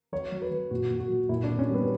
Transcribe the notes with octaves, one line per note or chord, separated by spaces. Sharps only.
F#3 C#5
F#3
B4
F#3
A#2 F#4
A#2
F#4
F#3
A#2 E4
D4
A#2
C#4
G3 B3